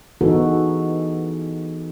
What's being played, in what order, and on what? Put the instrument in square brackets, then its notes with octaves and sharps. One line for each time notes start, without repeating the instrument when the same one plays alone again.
[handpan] E3 B3 D#4 F#4 G#4 A4